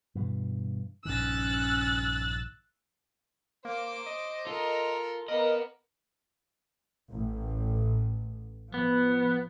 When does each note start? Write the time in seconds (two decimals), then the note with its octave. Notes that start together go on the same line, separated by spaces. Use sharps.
0.15 G2 B2 E3
1.05 A#1 G2 D#3 C#4 E6 F#6 A6
3.65 A#3 C5 D6
4.06 D#5
4.47 F4 A4 A#4
5.28 A#3 B3 A#4 D#5
7.12 A1 A2
8.74 F3 B3